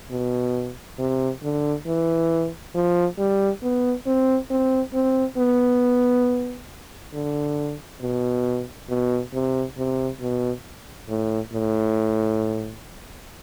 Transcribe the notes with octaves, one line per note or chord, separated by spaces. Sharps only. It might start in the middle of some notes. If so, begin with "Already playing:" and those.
B2
C3
D3
E3
F3
G3
B3
C4
C4
C4
B3
D3
B2
B2
C3
C3
B2
A2
A2